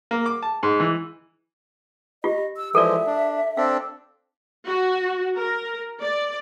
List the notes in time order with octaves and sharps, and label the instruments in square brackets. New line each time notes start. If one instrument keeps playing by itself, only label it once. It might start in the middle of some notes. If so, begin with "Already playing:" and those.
[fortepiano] A#3
D6
A5
G#2
E3
[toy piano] F4 G4 [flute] D#5
[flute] E6
[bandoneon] E3 F3 G#3 [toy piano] A4 A#4 D5 [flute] E5
[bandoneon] D4
[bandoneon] C4 D4 A4 [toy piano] F5
[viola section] F#4
A#4
D5